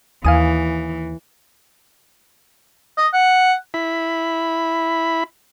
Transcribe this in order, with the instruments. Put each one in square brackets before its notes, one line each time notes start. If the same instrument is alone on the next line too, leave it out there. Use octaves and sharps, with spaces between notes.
[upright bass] D#2 [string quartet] E3 [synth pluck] F5 G#5 D#6
[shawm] D#5
F#5
[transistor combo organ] E4 B5